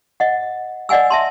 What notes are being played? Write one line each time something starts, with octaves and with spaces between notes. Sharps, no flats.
D#5 F#5
D5 D#5 F#5 G#5 E6
E5 A5 C6